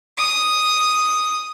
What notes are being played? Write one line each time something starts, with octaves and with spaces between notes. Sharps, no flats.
D#6